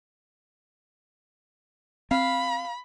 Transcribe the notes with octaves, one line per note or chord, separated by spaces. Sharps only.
C4 F5 B5